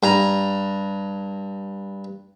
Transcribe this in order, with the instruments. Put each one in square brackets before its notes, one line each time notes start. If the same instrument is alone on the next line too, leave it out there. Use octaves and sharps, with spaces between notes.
[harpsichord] G2 A#5